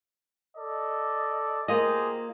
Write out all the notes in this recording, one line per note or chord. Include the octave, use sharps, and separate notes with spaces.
A4 D5 D#5
A#3 F4 G4 G#4 C5 D#5